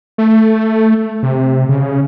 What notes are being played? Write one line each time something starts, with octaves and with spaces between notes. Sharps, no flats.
A3
C3
C#3